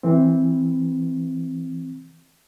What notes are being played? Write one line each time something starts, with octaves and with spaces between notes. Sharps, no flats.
E3 C4